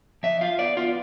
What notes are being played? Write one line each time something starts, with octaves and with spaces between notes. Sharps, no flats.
F3 E5
F4 F5
B3 D5
B3 F4